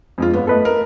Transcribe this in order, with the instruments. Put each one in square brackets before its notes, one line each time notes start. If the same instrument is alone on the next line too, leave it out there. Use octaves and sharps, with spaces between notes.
[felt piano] F2 G#3 F4
G1 B3
[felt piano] A3 B3 [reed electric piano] A4 B4 D#5
[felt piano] A#4